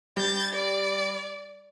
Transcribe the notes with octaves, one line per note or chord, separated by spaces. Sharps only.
G3 G6 A6
D5